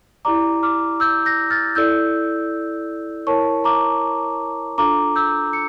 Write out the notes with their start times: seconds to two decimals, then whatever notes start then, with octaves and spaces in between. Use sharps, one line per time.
0.25 E4 G4 D5 A#5 D6
0.63 D6 F6
1.00 E6 G6
1.26 G6 A#6
1.50 F6 A6
1.75 E4 A4 D5 E6 G6
3.27 E4 A#4 C#5 A5 C#6
3.64 A#5 D6
4.78 D4 F4 A4 A#5 D6
5.16 E6 G6
5.53 C#7